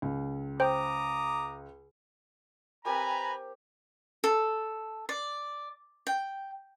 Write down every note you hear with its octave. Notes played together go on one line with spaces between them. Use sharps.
C#2
C5 G5 A#5 D6 D#6
C4 G4 A#4 B4 G#5 A#5 B5
A4
D5
G5